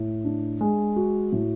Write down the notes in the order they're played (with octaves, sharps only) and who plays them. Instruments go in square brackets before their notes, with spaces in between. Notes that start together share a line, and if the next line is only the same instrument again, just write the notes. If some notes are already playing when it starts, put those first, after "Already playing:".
Already playing: [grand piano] A2
D4
G#3
F#4
A2